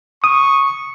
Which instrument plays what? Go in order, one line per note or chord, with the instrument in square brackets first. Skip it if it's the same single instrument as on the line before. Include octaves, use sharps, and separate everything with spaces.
[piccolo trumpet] C#6 [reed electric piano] D#6